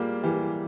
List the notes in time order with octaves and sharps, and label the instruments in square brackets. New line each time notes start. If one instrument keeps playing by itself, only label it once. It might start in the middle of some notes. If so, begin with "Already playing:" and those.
Already playing: [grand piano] G3 G#3 G4 G#4 [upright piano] A#3 F4
[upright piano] E3 [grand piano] G3 G4